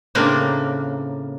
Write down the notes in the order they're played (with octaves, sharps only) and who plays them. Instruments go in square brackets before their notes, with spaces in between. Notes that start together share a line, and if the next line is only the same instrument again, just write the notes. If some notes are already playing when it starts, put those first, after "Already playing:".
[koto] A2 C#3 A#3 C4 D4